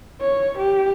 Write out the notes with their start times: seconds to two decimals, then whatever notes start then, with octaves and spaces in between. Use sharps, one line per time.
0.21 C#5
0.58 G4